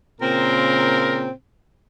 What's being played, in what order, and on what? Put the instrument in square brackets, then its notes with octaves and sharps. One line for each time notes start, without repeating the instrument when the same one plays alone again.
[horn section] A#2 C#3 C4 [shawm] A#4